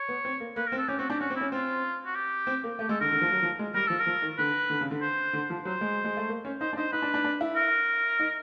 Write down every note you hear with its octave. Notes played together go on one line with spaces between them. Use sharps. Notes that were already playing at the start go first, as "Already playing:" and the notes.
Already playing: C#5
B3
C4
A#3
A#3 B4
A#4
C4
A4
C#4 G4
C4 F#4
D4 G4
C#4 F#4
C4
E4
C#4
C4 F4
F#4
G4
C4
A#3
A3 G4
G#3 A4
D3 A#4
D3
F3
F#3
F3
G#3
G3 A#4
F3 A4
A#4
F3
D#3
D3 B4
D3
C#3
D3
C5
D3
F3
F#3 C5
G#3
G#3
A3
A#3
C#4
D#4 C5
D4
D#4 C5
D#4 B4
D4
D4
D4
E4
A#4
D#4